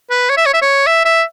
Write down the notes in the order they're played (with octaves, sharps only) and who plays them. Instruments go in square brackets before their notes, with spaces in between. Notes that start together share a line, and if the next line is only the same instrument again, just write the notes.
[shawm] B4
C#5
E5
C#5
E5
C#5
E5
E5